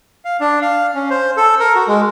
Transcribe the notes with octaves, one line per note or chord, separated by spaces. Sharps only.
F5
D4
F5
C#4
C5
A4
A#4
F#4
G#3